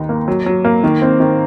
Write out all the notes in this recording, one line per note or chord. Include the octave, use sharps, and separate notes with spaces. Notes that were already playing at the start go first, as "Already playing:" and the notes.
Already playing: D#2 D#4
A#3
F#3
F#3
A#3
D#3
C4
D#3